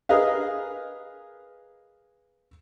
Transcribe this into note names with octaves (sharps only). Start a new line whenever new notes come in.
G#4 A#4 B4 D#5 F5